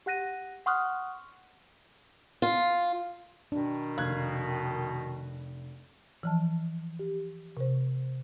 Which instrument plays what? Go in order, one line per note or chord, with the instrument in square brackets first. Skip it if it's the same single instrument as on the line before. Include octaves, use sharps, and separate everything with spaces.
[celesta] G4 F#5 F#6 A#6 D#7
F#5 C6 C#6 D#6 F6 F#6
[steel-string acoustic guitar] F4
[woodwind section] B2 D#3 [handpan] D4
[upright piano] F1 F#6 G#6 [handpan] F5
[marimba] E3 F3 A5
G4
C3 C5